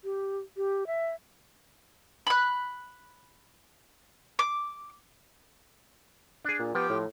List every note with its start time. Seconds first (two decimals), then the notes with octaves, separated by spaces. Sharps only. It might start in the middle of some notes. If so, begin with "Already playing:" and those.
0.04 G4
0.57 G4
0.87 E5
2.27 B5 F#6
4.39 D6
6.45 D4 G#4
6.59 A#2
6.75 F3 B3 G4 G5
6.90 A2